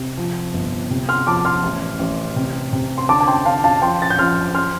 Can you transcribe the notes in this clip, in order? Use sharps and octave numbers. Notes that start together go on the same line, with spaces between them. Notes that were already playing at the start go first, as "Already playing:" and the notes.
Already playing: C3
F3
G1
C3
C6 F6
F3 A5 D6
C6 F6
A1
A1
C3
C3
C6
D3 A5 D6
A5
G5 C6
D3 F5 A5
F5 A5
F3 G5 C6
A6
G6
F3 C6 F6
C6 F6